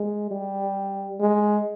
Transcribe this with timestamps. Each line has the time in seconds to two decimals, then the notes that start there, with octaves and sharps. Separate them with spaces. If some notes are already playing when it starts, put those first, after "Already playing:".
Already playing: G#3
0.31 G3
1.20 G#3